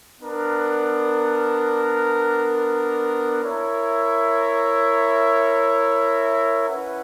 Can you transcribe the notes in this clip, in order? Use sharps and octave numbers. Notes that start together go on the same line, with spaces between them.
B3 D4 A#4
E4 A#4 C#5 E5
C#4 E4 B4 F#5